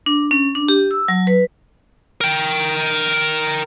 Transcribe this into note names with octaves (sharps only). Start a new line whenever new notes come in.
D4
C#4
D4
G4
E6
F#3
B4
A#4 G5